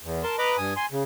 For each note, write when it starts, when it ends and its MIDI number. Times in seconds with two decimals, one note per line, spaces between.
0.03 0.23 40
0.23 0.36 70
0.23 0.36 81
0.23 0.36 84
0.38 0.57 71
0.38 0.57 75
0.38 0.57 82
0.38 0.57 83
0.38 0.57 86
0.58 0.74 43
0.58 0.74 80
0.58 0.74 87
0.76 0.86 80
0.76 0.86 84
0.92 1.03 49